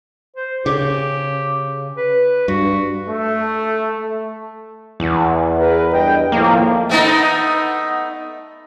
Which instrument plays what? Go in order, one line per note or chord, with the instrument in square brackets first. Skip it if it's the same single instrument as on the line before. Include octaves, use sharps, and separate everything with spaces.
[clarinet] C5
[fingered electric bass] C#3 [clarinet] G4
[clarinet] B4
[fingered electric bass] G2 [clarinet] F#4
[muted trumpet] A3
[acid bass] E2
[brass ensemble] G#4 A#4 B4
G2 D#5 G5
[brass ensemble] A2 D#3 F3 [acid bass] A#3
[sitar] A3 B3 D#4